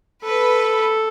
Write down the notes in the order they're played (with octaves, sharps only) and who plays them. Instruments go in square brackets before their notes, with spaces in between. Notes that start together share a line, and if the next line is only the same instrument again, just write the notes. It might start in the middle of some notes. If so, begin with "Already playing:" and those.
[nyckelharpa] A4 [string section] B4